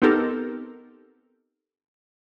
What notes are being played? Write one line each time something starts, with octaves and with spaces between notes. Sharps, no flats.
B3 C4 D#4 G4 A4 A#4